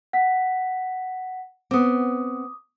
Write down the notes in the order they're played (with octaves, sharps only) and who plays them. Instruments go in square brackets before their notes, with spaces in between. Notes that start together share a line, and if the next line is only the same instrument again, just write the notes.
[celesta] F#5 B6
[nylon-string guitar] B3 C4 [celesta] D6 D#6